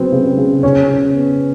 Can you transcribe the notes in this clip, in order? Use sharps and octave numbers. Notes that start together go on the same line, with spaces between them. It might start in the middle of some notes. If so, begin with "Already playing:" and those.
Already playing: C#3 F#3 B3 C4
C#3
C#3
C#3 C#4
C#3
B3